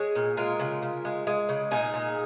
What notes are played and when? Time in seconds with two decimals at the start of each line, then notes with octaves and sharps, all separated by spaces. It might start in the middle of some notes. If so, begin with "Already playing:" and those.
Already playing: G#3 G#4 C#5
0.15 A#2
0.37 G#3 F4 A#4
0.60 C#3
0.82 C#3
1.05 G#3
1.27 G#3
1.49 C#3
1.71 A#2 D#4 G#4
1.94 A#2